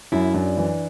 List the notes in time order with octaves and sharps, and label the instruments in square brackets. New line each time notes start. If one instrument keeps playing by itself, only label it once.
[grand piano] F#2 [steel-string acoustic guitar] E4
[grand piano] F#2 [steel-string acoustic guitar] D4
[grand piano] E3